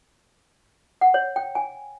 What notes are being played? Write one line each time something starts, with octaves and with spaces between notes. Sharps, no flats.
F#5
C#5
G5
G#5